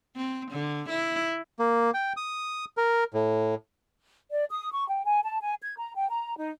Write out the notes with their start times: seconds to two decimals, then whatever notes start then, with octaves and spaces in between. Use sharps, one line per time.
0.16 C4
0.52 D3
0.89 E4
1.59 A#3
1.94 G5
2.17 D#6
2.77 A#4
3.14 A2
4.32 D5
4.51 D#6
4.72 C#6
4.89 G5
5.05 G#5
5.24 A5
5.41 G#5
5.62 G#6
5.78 A#5
5.96 G5
6.10 A#5
6.38 D#4